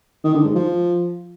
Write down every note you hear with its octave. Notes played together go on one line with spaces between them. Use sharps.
D#3
D3
G#2
F3